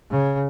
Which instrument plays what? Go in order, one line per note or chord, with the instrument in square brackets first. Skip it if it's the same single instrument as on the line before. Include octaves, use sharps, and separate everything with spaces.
[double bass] C#3